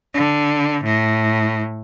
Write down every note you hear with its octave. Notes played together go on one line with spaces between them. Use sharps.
D3
A2